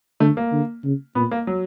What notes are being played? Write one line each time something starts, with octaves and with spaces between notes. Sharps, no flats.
D3 A3
A#3
D3
C#3
A#2 B3
A#3
F#3